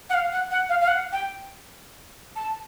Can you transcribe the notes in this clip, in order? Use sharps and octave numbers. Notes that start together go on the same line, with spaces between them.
F#5
F5
F#5
F#5
F5
F5
F#5
G5
A5